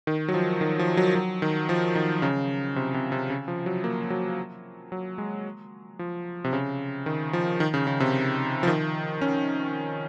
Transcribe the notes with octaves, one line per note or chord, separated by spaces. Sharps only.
D#3
F#3
F3
D#3
F3
F#3
F#3
D#3
F3
D#3
C#3
C3
C3
C3
C#3
F3
F#3
A#3
F#3
F#3
G#3
F3
C3
C#3
D#3
F3
D#3
C#3
C#3
C3
F3
D#3
C#4